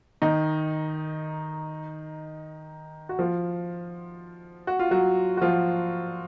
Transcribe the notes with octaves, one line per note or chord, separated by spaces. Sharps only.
D#3 D#4
F#4
F3 F4
F#4
F4
F#3 F#4
F#4
F3 F4